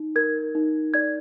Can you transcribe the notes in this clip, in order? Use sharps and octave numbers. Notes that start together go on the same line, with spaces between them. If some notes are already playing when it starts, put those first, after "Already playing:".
Already playing: D#4
A#4 G#6
D#4
D5 G#6